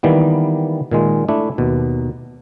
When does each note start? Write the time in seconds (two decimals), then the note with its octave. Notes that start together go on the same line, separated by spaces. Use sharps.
0.03 D#3 E3 G3 A#3 B3
0.91 A#2 D#3 G#3
1.29 A3 D4 E4
1.58 D#2 B2